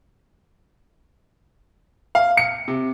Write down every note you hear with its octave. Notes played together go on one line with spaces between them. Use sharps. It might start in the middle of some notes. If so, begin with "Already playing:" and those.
F5
C#7
C3